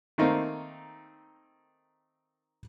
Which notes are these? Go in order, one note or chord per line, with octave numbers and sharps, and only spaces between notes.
D#3 A3 A#3 C4 D#4 A#4